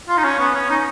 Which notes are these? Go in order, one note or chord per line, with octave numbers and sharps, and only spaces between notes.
F4
D#4
C#4
B3
C#4
D#4